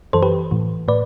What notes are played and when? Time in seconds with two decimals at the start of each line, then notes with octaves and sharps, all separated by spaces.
0.13 F#2 E3 A4 C5
0.23 G4 B4
0.51 A2 E3
0.88 A2 B4 D5